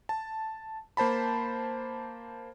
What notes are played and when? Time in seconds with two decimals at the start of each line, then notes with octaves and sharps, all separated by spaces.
0.09 A5
0.97 A#3 C5 A5 B5